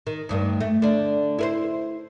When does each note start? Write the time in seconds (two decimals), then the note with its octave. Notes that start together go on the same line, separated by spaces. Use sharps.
0.07 D#3
0.29 D2 G2 D#3
0.60 A3
0.82 D3 D4
1.39 E4 B4 C5